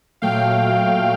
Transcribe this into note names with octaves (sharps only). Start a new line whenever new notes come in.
A#2 F#3 A3 F5 G5